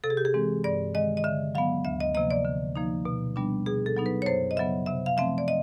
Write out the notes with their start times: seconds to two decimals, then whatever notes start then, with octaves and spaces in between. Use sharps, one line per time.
0.04 C3 A4
0.10 G#4
0.17 G4
0.25 G#4
0.34 E3 G#3 C4
0.64 G2 D5
0.94 D#3 G#3 D#5
1.17 D#5
1.24 D3 E5
1.55 F#3 B3 F5
1.85 D2 E5
2.00 D#5
2.15 C3 F3 A#3 D#5
2.31 D5
2.45 D3
2.76 F3 A#3 D#4
3.05 B2
3.36 G3 B3 D4
3.66 B2 G#4
3.86 A4
3.97 F#3 B3 D#4
4.06 B4
4.22 C#5
4.26 F#2 C5
4.51 D#5
4.57 C#3 F#3 B3 E5
4.86 C3 E5
5.06 F5
5.17 F3 A3 C4 E5
5.38 D5
5.48 D#5